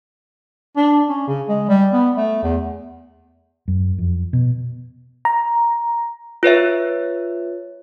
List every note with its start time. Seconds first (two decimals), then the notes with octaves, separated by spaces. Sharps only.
0.76 D4
1.09 C#4
1.27 C#3
1.49 G#3
1.69 G3
1.93 B3
2.17 A3
2.43 E2
3.68 F#2
3.98 F2
4.33 B2
5.25 A#5
6.43 F4 B4 C#5 E5